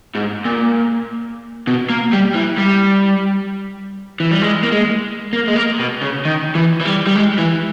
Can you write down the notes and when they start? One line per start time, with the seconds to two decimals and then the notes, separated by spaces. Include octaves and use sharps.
0.15 G#2
0.45 A#2
1.67 B2
1.90 A#3
2.13 G3
2.35 E3
2.58 G3
4.20 E3
4.31 G3
4.42 G#3
4.63 A#3
4.72 G#3
5.33 A#3
5.48 G#3
5.56 A#3
5.79 B2
6.01 C#3
6.25 D#3
6.55 E3
6.81 E3
6.86 G3
7.07 G3
7.16 G#3
7.39 E3